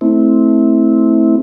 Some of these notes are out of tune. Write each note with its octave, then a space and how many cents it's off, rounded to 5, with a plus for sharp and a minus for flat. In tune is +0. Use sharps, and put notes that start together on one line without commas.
A3 +0 C4 +0 E4 -20